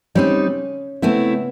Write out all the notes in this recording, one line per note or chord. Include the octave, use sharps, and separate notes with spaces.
G3 C4 C#4 D#4
A3 B3 C4 E4